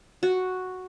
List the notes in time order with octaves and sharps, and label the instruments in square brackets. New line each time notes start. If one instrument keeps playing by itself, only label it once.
[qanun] F#4